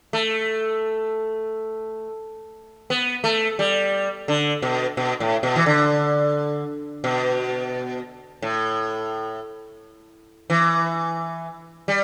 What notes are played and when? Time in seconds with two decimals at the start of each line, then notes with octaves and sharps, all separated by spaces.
0.13 A3
2.90 B3
3.24 A3
3.59 G3
4.28 D3
4.62 B2
4.97 B2
5.20 A2
5.43 B2
5.56 E3
5.66 D3
7.04 B2
8.42 A2
10.50 E3
11.88 G3